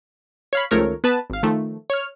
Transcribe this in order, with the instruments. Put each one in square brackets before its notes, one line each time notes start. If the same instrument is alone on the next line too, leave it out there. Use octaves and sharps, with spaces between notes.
[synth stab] C#5 F5 B5
C#2 D#3 F3 A3 A#4 C#5
B3 B4 A5
G#1 F5
D#3 F3 A3
C#5 F6